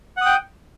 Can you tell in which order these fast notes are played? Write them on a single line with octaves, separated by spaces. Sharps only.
F#5 D#6 G5